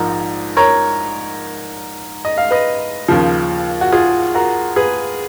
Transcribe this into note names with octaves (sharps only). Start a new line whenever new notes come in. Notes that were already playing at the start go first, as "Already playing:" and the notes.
Already playing: A#1 G#2 F3 A#4
A#4 C#5
D#5
F5
B4 D#5
D#2 C#3 F3
F#4
F4 G#4
F#4 A#4
G#4 B4